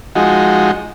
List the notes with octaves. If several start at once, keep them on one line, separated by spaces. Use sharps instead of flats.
F3 G#3 D#4 F#4